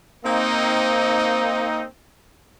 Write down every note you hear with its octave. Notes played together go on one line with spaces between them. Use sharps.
A#3 C4 D#4